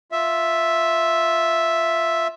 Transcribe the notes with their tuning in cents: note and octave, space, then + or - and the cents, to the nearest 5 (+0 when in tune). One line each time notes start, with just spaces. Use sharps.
F4 +0 E5 +0